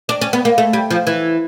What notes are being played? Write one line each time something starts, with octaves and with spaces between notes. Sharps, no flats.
D4
C#4
B3
A#3
A3
G3
F3
E3